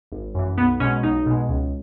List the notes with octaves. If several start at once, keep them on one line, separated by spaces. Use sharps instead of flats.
G#1
F#2 E3
B1 B3
B2 G#3 C#4
B1 D#4
B2 G#3
C#2